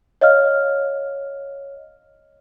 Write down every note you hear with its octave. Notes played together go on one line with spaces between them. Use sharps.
C#5 D#5 F5 F6